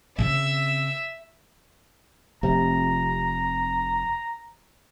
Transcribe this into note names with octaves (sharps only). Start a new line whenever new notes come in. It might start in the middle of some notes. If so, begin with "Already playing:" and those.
C#3 C4 E5 E6
F1 C3 A#5